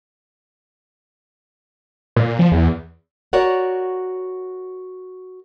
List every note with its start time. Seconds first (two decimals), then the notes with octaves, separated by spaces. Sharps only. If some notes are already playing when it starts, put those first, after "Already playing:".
2.16 A#2
2.39 F3
2.52 E2
3.33 F#4 A#4 C#5 D5 F#5